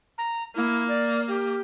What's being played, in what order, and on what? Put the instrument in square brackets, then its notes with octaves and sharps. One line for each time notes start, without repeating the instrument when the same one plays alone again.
[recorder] A#5
[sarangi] A#3 [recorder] E4
[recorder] D5
G4